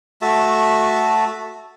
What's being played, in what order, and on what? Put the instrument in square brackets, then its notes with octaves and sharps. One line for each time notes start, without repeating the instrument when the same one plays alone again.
[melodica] A3 F#4 E5 A5